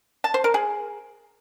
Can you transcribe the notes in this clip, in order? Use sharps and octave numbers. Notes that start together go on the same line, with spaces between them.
A5
C5
A#4
G#4